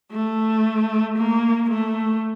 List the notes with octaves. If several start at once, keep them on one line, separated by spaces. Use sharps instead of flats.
A3
A#3
A3